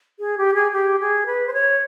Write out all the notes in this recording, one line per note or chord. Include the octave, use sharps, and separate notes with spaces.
G#4
G4
G#4
G4
G#4
B4
C5
C#5